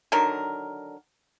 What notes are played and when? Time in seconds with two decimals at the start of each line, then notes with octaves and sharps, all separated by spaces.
0.12 D3 D#3 F#3 A#4